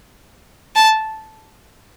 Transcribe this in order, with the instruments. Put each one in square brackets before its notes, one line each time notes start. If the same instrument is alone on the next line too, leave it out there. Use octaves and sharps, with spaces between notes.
[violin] A5